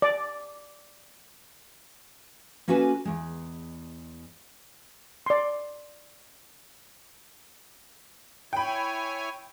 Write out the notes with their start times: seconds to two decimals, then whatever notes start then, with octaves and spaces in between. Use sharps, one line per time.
0.02 D5
2.68 A#3 C#4 F#4 A4 B4 G#5
3.05 E2 G#3
5.26 D5 C6
8.53 E4 C#5 G5 G#5 B5